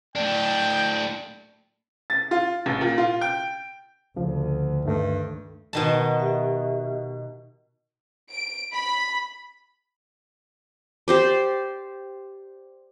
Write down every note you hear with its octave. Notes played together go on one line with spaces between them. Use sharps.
A2 D4 G5
A6
F4
A1
A#2
F4
G5
D2 C#3 F3
G2 D#3 A3
B2 D#3 A5
G4 E5
D7
B5
G4 C5 D5